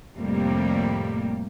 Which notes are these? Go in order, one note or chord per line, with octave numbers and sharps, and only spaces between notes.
F2 A2 C3 G3 A#3